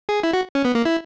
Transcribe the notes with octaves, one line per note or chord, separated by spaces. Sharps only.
G#4
E4
F#4
C#4
B3
A#3
E4